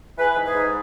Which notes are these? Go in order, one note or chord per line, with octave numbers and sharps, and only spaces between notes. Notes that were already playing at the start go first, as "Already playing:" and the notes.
E3 G#4 B4
G#2
G#4 B4
G#2